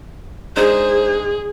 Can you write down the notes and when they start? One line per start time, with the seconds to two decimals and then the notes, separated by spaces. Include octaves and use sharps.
0.56 G#3 D4 D#4 G#4 C5